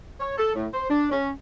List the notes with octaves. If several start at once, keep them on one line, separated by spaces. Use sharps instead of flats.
C#5
A4
A2
C5
D4
C#4